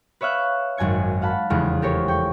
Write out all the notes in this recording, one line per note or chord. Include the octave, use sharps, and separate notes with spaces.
B4 C#5 E5 F5 F#6
G#1 F#2 G#5 G#6 C#7
F5 F#5 A5 B5
F1 E2 C#3 G#3 F6
G4 A4 A#4 C5 C#5
G5 C#6